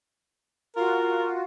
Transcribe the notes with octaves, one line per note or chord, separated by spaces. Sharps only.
F4 F#4 A#4